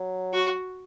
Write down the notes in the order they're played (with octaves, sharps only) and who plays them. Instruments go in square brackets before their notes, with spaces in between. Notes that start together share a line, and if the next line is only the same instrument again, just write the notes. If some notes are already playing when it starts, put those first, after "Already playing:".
Already playing: [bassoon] F#3
[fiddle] F#4